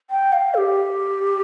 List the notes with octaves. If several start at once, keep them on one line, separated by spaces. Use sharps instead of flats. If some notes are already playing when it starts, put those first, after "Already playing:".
G5
F5
A4
G4